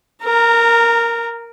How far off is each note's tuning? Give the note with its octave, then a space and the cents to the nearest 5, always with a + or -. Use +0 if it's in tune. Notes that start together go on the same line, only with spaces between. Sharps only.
A#4 +0 A#5 -25